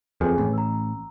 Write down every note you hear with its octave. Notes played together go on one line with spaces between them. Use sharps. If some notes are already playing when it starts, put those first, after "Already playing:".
F2 G#4 B4 G#5
A1
A#5 E6